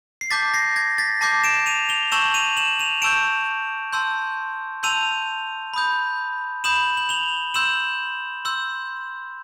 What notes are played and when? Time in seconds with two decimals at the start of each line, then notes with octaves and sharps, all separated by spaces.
0.21 C7
0.30 A5 D6 G6 A6 B6
0.54 A#6 C7
0.76 G#6 A#6
0.98 A6 B6
1.21 A5 D6 G6 A#6 C7
1.44 D7 E7
1.66 D#7 F7
1.89 F7 G7
2.12 A5 C#6 E6 G6 E7 F#7
2.34 D#7 F7
2.57 E7 F#7
2.79 D#7 F7
3.02 A5 C#6 E6 G6 D7 E7
3.93 A5 C6 E6 G6
4.83 A5 C6 E6 G6 D#7 F7
5.74 B5 D#6 G6
6.64 B5 D#6 G6 E7 F#7
6.97 F#7
7.09 F7 G7
7.54 C6 E6 G6 E7 F#7
8.45 C6 E6 G6